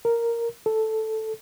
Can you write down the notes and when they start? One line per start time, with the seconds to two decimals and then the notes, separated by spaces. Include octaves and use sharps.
0.05 A#4
0.66 A4